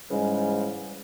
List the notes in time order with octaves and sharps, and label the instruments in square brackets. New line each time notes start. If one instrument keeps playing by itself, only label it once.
[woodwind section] G#2 C#3 E3 G3 G#3 C#4